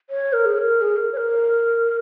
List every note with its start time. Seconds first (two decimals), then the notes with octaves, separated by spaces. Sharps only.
0.10 C#5
0.33 A#4
0.45 G#4
0.58 A#4
0.81 G#4
0.97 A#4
1.13 C#5
1.17 A#4